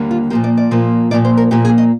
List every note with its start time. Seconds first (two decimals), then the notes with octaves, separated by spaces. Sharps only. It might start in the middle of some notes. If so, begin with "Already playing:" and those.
Already playing: D#2 D3 G3 A#3
0.11 F4
0.30 A#2 F3 A#3 G4
0.44 D5
0.57 D5
0.71 A#2 F3 A#3
1.11 A#2 F3 A#3 D5
1.25 C5
1.37 A#4
1.51 A#2 F3 A#3 G4
1.65 G#4
1.78 D#5